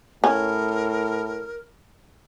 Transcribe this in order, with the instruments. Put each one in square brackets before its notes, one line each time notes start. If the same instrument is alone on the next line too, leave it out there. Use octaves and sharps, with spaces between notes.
[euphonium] A2 [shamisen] C#4 [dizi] A#4